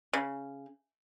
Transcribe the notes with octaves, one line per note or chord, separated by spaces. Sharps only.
C#3